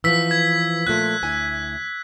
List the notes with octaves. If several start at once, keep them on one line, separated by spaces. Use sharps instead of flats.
E3 F3 B3 E6 B6
G#6
A#2 F3 A3 F#6
D2 E4 G#5